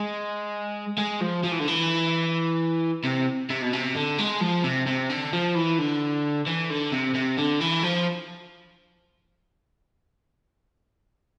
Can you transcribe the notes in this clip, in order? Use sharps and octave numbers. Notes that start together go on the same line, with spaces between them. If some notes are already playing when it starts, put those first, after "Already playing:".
Already playing: G#3
G#3
F3
F3
E3
D3
E3
C3
C3
B2
C3
D3
G#3
F3
C3
C3
D3
F3
E3
D3
E3
D3
C3
C3
D3
E3
F3